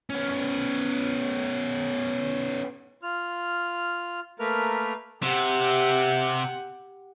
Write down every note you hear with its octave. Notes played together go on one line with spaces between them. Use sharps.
B3 C#4
F4 F6
A3 A#3 A#4 B4 F6
C3 G4 F#5